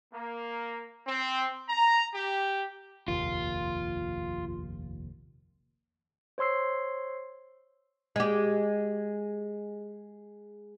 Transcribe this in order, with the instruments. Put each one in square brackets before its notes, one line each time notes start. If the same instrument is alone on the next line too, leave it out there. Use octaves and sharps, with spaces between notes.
[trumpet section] A#3
C4
A#5
G4
[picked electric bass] F1 A#1 D#2 [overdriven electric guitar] F4
[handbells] C5 C#5 C6 E6 C7
[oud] G#3 G4